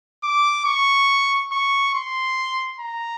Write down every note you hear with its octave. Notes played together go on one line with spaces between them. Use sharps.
D6
C#6
C#6
C6
A#5